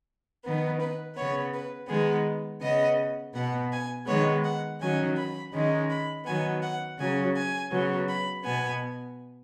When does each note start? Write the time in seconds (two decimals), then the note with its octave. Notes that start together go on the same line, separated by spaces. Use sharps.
0.44 D#3 B3
0.81 B4
1.16 C#3 B3 C#5
1.53 B4
1.89 D#3 G#3 B3 G#4
2.62 C#3 B3 D#5
3.34 B2 B3 F#5
3.72 G#5
4.07 D#3 G#3 B3 C#5
4.44 F#5
4.81 D#3 F#3 C#4 G#5
5.17 B5
5.54 D#3 G#3 C#4
5.90 B5
6.26 D#3 F#3 B3 G#5
6.62 F#5
6.98 C#3 F#3 C#4 G#5
7.36 G#5
7.71 C#3 F#3 B3
8.08 B5
8.45 B2 B3 G#5